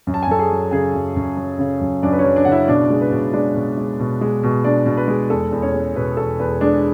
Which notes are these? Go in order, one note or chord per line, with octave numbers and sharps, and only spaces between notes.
F#2
A5
G#5
F#2 A4 A5
G#4 G#5
F#3
C#3 G#4 G#5
F#2
F#2
F#3
C#3
F#2
F#2 D4 D5
B4
C#4 C#5
F#3
D4 D5
C#3 F#5
E4 E5
B2 D4 D5
G#3
B4
B2
G#3 D4 D5
B2
G#3
B2
G#3
B2
G#3 D4 D5
B2
B4
G#3
E2 A4
E2
C#4 C#5
G#3
B2 B4
E2 A4
E2 B4
G#3 D4 D5